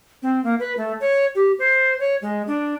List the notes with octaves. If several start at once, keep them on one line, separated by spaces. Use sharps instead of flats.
C4
A#3
B4
A3
C#5
G4
C5
C#5
G#3
D4